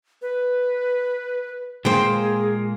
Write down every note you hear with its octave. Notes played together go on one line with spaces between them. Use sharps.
B4
A#2 G#3 A#3 G#4 C5 G5